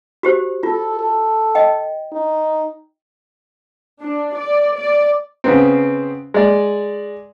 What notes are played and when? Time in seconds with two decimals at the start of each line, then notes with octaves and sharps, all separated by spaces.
0.23 F#4 G4 C5
0.63 F4 A4
1.00 A4
1.55 D#5 G5
2.12 D#4
4.01 D4
4.36 D5
4.77 D5
5.44 C#3 B3 C4
6.34 G#3 D5